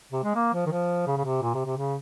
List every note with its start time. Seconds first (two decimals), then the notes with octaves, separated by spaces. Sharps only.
0.12 C3
0.24 G#3
0.35 A#3
0.54 F3
0.66 D#3
0.71 F3
1.07 C#3
1.17 C#3
1.25 C3
1.42 A#2
1.54 C3
1.65 C3
1.77 C#3